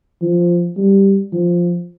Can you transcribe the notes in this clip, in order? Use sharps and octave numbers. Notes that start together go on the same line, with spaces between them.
F3
G3
F3